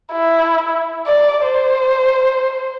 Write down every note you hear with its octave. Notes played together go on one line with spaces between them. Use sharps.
E4
D5
C5